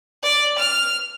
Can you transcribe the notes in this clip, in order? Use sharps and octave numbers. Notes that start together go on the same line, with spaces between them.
D5
F6